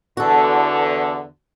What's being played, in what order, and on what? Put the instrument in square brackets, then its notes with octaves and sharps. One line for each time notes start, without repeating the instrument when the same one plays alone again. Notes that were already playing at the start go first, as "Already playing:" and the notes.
[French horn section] E2 D3 [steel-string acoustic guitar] F#4 A4